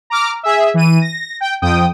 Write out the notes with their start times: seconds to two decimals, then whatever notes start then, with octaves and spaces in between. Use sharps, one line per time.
0.10 A#5 D6 F6
0.43 G#4 E5
0.74 E3 D#7
1.01 A#6
1.40 G5
1.62 F2 G5 D#6